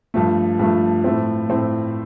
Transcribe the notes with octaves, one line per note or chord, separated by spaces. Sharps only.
G2 F3 A3
G2 F3 A3
A2 A3 C4
A2 A3 C4